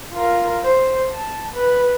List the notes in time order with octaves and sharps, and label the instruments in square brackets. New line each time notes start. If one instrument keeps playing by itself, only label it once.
[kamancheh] F4 A#4
C5
A5
B4